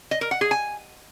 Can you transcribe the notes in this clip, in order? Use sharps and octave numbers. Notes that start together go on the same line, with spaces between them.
D#5
A#4
F#5
G#4
G#5